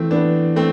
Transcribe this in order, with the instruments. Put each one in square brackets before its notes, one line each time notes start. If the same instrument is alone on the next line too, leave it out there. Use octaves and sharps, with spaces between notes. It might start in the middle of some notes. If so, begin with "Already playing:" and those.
Already playing: [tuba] E3 [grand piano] A3 C4
[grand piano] B3 D4
A3 C4